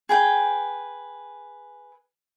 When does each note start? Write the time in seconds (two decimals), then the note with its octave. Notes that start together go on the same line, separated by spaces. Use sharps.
0.09 G#4 B4 G5